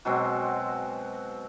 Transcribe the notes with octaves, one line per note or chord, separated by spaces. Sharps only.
B2 F#3 G#3 C4